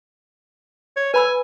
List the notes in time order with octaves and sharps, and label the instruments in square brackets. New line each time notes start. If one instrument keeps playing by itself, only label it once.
[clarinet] C#5
[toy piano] B4 B5 E6 [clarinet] G#5